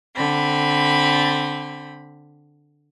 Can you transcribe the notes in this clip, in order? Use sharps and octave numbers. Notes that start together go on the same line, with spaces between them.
D3 C4 B5